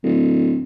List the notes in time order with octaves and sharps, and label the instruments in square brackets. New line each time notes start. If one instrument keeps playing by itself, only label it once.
[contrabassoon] D1